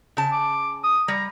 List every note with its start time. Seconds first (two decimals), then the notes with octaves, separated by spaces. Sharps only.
0.17 C#3 A5
0.32 D6
0.84 D#6
1.08 G3 A#5